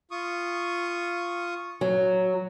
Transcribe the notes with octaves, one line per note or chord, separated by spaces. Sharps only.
F4 C#6 D#6
F#3